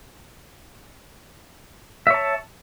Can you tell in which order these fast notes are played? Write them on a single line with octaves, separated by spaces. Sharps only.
E5 C#5 A5